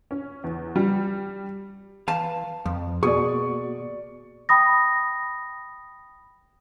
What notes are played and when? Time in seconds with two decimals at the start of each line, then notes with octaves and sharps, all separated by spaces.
0.11 C#4
0.44 E2
0.76 G3
2.08 E3 F5 A5
2.66 F2 F3
3.03 B2 A#3 B3 F#4 G#4 D5 C#6
4.49 G5 B5 D#6 A#6